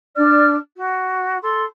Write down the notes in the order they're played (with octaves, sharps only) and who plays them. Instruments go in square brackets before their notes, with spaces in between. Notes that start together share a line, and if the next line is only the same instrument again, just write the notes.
[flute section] D4 D5 F6
F#4
A4 C6